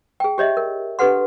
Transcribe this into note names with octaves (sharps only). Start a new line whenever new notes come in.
G#4 G5
G4 C#5 D#5 E5
A#4
D4 G4 A4 B4 F#5 C6